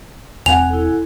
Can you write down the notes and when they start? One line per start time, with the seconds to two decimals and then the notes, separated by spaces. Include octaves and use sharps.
0.46 E1 C4 F#5 G#5 F7
0.70 E4 A4